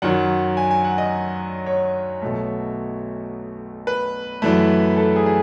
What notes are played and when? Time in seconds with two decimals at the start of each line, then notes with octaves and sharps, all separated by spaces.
0.02 F#2 D#3 F#3 F#5
0.57 G#5
0.71 G#5
0.84 F#5
0.98 D#5
1.66 C#5
2.22 B1 B2 A3
3.87 B4
4.42 F#2 E3 A3
4.97 A4
5.16 G#4
5.26 G#4